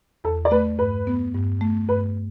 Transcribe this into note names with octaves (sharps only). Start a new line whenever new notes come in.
E2 A4
D5
A3 B4
G2 B4
B3
G2
A3
G2 B4